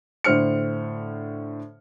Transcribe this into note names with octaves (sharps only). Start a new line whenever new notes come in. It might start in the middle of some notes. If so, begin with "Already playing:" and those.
A2 D3 C5 F6 C#7